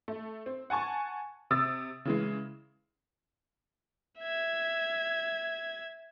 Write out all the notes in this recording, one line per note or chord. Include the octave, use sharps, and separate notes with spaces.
A3
C4
F#5 G#5 A5 C#6
C3 D#6 E6 A6
C#3 E3 G#3
E5 G#6